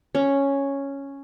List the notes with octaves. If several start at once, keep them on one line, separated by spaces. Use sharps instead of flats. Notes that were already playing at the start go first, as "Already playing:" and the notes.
C#4